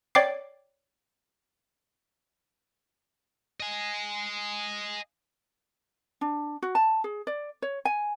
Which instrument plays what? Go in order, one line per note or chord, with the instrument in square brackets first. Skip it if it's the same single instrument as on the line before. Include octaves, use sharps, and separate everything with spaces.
[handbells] C#5 D5 G5 D6 C7
[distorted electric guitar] D#5 G#5
[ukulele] D4
F#4
A5
G#4
D5
C#5
G#5